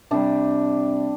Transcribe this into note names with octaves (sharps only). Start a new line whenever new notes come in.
C3 G3 D4